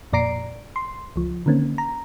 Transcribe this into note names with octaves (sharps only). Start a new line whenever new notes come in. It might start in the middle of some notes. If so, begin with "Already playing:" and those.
F2 A#2 D5 A#5 C7 D7
C6
C#2 F3
D3 D#3 A#3 C4 C#4
A#5